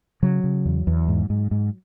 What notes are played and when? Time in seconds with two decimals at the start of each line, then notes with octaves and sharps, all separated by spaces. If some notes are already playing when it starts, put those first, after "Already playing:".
0.23 C#3 F#3
0.44 C#3
0.66 E2
0.87 E2
1.08 G#2
1.30 G#2
1.51 G#2